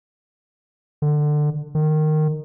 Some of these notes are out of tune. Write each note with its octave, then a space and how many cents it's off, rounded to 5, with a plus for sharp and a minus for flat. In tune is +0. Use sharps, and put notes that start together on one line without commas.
D3 +20
D#3 -15